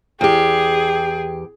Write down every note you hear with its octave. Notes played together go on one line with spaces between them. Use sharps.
E2 G4 G#4 G5